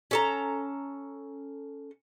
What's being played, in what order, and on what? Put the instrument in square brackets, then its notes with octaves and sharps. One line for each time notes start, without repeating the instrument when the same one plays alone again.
[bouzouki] C#4 A4 A#5